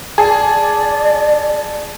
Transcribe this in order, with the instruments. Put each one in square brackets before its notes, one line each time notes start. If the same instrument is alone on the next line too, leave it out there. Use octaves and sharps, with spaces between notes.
[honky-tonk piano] G#4 [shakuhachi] D5 [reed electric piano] A5